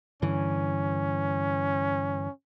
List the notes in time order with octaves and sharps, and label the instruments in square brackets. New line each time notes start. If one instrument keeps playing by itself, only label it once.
[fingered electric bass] G2 D3 E3 [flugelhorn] C#4